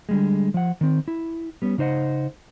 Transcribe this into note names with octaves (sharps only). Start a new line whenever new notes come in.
D3 G3 G#3
F3 F#5
D#3 C4
E4
G3 B3 C#4
C#3 D#4 C5 D#5 F#5